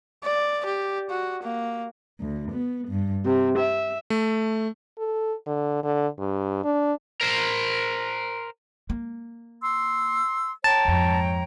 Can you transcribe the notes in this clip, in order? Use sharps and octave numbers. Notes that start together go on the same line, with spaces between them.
D5
G4
F#4
A#3
D2
B3
G2
C3
E5
A3
A4
D3
D3
G2
D4
A#4 C5
A#3
C6 E6
C#5 G5 A5 A#5
F2 G#2